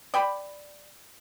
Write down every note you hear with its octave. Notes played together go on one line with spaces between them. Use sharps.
D5 G5 B5